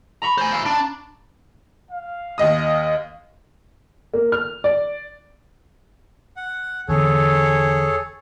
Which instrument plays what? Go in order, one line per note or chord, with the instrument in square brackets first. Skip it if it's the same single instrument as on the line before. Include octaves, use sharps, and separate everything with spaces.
[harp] A#5 B5 C#6
[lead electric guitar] C5 G#5
E4 F5
D4
[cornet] F5
[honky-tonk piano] D#2 D#5 D#6
[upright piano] A#3
F6
D5
[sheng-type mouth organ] F#5
[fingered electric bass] E2 D3 [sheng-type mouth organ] G#4 A4 C#5